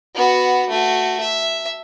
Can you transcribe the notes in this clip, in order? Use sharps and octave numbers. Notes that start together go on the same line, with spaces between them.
B3 F#4
A3 F#4
E5